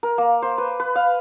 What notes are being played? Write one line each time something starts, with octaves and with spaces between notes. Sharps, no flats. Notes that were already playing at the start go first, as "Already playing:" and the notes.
A#4
A#3
C5
B4
B4
F5